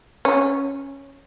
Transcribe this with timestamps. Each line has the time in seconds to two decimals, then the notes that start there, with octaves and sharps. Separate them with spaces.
0.25 C#4